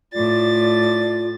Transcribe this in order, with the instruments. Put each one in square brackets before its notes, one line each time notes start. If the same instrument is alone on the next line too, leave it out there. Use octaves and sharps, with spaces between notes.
[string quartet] A2 A6 [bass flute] F4 [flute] D5